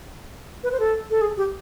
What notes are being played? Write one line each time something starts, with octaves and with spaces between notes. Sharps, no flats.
B4
C5
A4
A4
G#4
G4